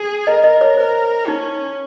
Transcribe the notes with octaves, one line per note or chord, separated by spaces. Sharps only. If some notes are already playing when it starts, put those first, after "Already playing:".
Already playing: G#4
A#4 D#5
D#5
C#5
A#4 C5
C#4 D#4